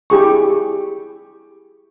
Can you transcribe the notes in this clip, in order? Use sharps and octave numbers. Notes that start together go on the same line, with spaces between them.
E4 G4 G#4 C#6